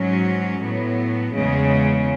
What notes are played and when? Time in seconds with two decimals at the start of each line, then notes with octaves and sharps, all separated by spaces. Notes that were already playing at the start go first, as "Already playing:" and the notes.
Already playing: G#2 F#3 C#4
0.62 A2 F#3 B3
1.34 E2 C#3 G#3